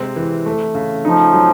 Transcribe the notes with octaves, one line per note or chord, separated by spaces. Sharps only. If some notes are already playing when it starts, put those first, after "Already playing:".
Already playing: C3 G#3 C4
E3
A3
C#3
F3 D#4
F#3